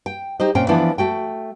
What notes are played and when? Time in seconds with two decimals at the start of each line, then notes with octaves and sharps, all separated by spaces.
0.06 G5
0.40 D#4 G4 C5 D#5
0.55 A#2 C4 C#4 G5
0.69 E3 F3 B3 D4 E4
0.98 A3 F#4 G5